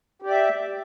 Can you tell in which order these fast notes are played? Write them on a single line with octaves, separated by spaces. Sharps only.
G4 D5 E5